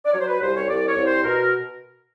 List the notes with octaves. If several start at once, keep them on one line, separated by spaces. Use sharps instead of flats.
D5
F#3 C#5
C5
B4
C2 C5
C#5
C2 D5
C#5
C2
C5
B2 A#4